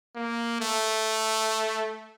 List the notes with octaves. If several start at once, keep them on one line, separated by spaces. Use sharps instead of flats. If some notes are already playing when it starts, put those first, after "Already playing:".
A#3
A3